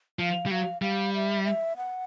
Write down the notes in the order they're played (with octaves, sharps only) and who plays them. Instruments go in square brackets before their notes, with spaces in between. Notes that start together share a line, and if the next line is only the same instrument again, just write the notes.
[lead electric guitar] F3 [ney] F5
[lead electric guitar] G3
[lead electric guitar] F#3 [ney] F5
[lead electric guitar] G3 [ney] F5
[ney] E5
E5
F#5